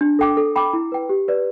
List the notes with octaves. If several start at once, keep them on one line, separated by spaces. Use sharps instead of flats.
D4
A4 G5 D6
A4
G5 B5 D6
E4
B4 G5
G4
B4 D5